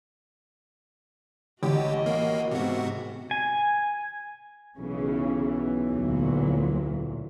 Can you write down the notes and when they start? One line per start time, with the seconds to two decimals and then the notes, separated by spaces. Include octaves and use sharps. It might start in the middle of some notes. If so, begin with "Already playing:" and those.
1.63 A1 F#4 G4 D#5
2.06 A#3
2.51 G#2 C3 B3 F#4
3.31 G#5
4.78 B1 C#3 E3
5.90 D2 A#2 F#3